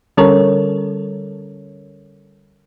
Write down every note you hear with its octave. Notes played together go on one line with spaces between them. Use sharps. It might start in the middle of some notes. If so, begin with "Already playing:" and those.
D3 G3 C#4 A4 A#4 C#5